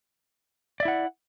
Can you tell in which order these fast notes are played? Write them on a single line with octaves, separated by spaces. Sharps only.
D5 E5 E4 F#5